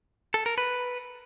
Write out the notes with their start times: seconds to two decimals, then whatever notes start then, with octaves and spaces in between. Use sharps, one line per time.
0.34 A4
0.46 A#4
0.58 B4